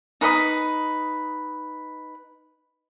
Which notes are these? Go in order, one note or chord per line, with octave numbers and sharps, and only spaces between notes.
D#4 B4 B5 D#6